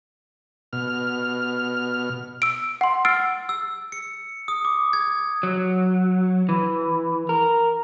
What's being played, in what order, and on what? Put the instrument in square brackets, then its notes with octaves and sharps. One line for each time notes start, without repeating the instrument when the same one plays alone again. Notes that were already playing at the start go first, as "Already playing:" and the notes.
[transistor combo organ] B2 F6
[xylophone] E6 D7
F#5 C6
E6 F6 A6 C7 D7
[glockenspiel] E6
C#7
D#6
D6
G#6
[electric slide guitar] F#3
E3
A#4